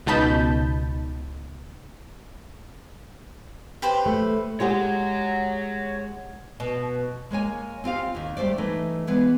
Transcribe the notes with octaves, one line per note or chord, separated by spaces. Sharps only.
C#2 B2 D#4 A5 B5 G6
G4 B4 C5
A3
G#3 G4 G#4 C#5 F#5
B2
G#3 A#3 C#5 G#5
C4 F4 G4 F5
D#2 D#3
G3 A3 C5 D5
E3 A3 D#4
E3 G#3 B3